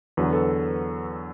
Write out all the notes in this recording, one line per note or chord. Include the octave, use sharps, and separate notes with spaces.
E2 D3 F#3 B4
A4